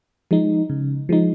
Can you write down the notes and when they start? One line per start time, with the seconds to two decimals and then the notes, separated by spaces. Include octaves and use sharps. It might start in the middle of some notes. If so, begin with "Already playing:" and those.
0.31 F3 G#3 D#4
0.70 C#3
1.09 F3 G#3 D#4